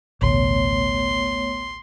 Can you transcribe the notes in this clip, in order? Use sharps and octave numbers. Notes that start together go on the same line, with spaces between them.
A1 D2 B2 A3 B3 C#5 C6